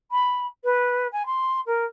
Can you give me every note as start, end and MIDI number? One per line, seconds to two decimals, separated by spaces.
0.11 0.46 83
0.64 1.07 71
1.12 1.25 80
1.26 1.60 84
1.66 1.84 70